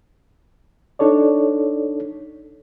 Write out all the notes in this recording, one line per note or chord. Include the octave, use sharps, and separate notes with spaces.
D4 D#4 A4 C#5 D5